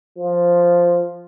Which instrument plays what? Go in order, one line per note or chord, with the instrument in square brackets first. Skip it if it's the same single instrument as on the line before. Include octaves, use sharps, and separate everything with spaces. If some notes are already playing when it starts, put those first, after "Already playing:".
[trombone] F3